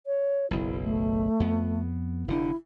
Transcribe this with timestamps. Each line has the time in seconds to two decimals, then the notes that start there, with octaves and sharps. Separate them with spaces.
0.06 C#5
0.51 F#1 B1 E4
0.83 A3
1.40 F2 B3
2.28 F1 D3 D4 E4